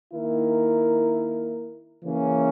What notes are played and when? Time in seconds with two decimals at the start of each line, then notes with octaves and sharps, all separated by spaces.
0.13 D#3 A#3 E4 A#4
2.03 C#3 E3 A#3 C#4